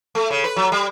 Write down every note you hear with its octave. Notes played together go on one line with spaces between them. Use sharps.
A3
C#3
B4
F#3
G3